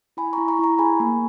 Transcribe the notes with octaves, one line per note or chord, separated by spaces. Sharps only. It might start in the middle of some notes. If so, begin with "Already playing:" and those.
E4 G#5 B5
E4 A#5 C#6
A#5 C#6
E4 A#5 C#6
G#4 G#5 B5
A#3